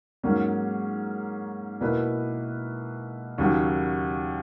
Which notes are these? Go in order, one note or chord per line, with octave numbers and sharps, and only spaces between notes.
G#2 F#3 A#3 C#4
B2 A#3 E4 B4
D#2 C#3 F#3